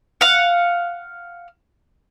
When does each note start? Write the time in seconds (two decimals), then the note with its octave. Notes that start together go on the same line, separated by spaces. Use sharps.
0.21 F5 F#5